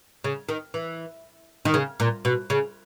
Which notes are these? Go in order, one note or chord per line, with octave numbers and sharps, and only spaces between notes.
C#3
D#3
E3
D#3
C#3
A#2
B2
C#3